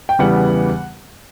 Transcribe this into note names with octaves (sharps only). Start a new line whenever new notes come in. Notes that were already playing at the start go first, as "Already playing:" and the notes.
G5
E2 C#3 E3 G3 B3 F#5